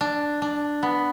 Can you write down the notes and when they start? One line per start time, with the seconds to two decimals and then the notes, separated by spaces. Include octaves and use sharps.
0.01 D4
0.42 D4
0.83 B3